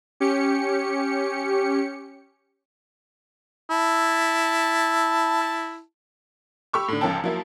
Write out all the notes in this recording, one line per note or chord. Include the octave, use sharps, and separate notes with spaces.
C#4 G4 C#7
E4 A5
G4 B5 C#6 E6
A2 D3
C#2 F3 C#4 A#4 G5 A5
F3 F#3 A#3 E4